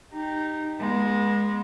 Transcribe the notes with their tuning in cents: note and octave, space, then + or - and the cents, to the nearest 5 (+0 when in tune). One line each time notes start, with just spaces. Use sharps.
D#4 -15 G4 +0
G#3 +0 B3 -40